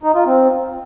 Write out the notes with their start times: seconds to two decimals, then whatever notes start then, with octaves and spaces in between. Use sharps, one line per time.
0.03 D#4
0.15 F4
0.26 C4